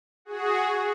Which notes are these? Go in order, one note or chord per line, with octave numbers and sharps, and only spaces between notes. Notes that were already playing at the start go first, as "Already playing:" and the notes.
F#4 G#4